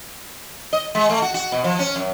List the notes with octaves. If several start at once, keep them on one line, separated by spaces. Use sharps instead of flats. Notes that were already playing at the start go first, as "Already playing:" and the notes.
D#5
G#3
A3
F#4
F#4
B2
F3
C#4
F#2